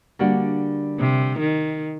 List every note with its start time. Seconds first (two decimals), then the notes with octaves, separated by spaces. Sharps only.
0.19 D3 G3 A#3 D4 F#4
1.00 C3
1.40 D#3